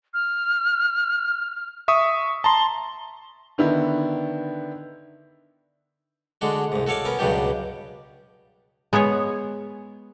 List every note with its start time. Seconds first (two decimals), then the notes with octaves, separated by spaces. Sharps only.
0.14 F6
1.88 E5 C#6 D#6
2.44 A5 A#5 C6 G7
3.58 D3 D#3 B3 D4 E4
6.41 D3 G#3 D4 F#4
6.72 C2 G#2
6.87 F#4 A4 C#5 D5 F5
7.05 B3 C#4 A#4
7.19 C#2 G2 B2 F#3 D4 G4
8.93 G#3 B3 G#4 C#5